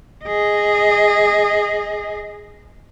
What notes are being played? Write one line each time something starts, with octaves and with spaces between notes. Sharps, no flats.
G#4 D#5